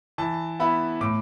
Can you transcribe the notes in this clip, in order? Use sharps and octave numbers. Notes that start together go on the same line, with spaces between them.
E3 A5
B3 E4 B5
A2 D6